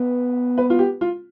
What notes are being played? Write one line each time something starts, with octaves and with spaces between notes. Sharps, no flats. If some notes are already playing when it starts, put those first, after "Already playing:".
Already playing: B3
B4
F4
G4
F4